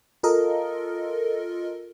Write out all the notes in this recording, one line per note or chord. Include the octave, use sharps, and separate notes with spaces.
F4 A4 A#4 D#5